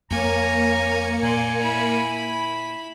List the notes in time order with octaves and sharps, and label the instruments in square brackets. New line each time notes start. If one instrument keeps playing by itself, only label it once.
[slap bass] F2 [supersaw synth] A#3 C#7 [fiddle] C#5 G#5 [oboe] A#5
[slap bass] A#2 [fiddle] D5 C6 [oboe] G#5
[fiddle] E4 B5